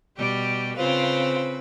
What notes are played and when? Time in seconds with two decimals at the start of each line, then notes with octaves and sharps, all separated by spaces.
0.18 B2 G3 G4
0.77 C#3 C4 F4 B4 C5